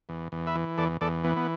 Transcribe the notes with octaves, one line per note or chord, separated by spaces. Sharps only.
E2
E2
B4 E5
E3
E2 A4 D5
E2 A4 D5
E3 B3
B3